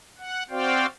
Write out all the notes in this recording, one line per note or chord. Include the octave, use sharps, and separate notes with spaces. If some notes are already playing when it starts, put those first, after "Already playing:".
F#5
C4 F#4 C5 D5 F5 G5